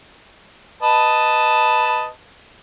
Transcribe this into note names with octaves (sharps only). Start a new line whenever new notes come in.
B4 D#5 A5